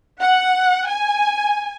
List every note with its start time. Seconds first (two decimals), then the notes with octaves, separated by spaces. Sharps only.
0.21 F#5
0.89 G#5